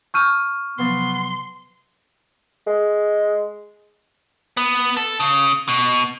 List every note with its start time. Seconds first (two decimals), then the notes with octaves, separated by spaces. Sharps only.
0.14 A5 C#6 E6 F6 G6 D#7
0.78 C3 F3 F#3 B3 C6
2.67 G#3
4.57 B3
4.97 A4
5.20 C#3
5.68 B2